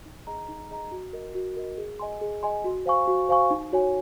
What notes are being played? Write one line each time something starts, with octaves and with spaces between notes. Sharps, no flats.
D#4
G#4 D#5 A#5
D#4
G#4 D#5 A#5
F#4
A#4 D#5
F#4
A#4 D#5
G#4
D#5 G#5 C6
G#4
D#5 G#5 C6
F#4
C5 F5 G#5 C#6
F#4
C5 F5 G#5 C#6
D#4
F#4 C#5 G#5